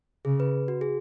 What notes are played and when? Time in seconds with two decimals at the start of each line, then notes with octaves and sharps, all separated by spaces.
0.25 C#3 G#4
0.40 B4
0.68 F#4
0.81 G#4